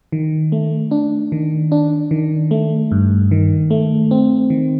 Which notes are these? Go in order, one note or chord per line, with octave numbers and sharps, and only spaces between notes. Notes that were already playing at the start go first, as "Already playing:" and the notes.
D#3
A3
D4
D#3
D4
D#3
A3
G2
D#3
A3
C4
D#3